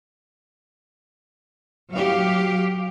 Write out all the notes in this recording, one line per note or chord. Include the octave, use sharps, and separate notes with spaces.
F#3 G4 F5